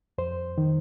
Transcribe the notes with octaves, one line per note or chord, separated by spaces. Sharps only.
F2 C5
D#3